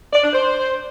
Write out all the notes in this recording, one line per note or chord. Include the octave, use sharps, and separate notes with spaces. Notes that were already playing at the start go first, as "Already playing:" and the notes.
D5
D4
C5